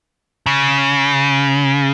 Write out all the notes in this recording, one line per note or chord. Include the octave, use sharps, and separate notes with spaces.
C#3